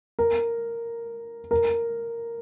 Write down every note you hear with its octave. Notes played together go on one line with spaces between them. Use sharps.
A#4
A#4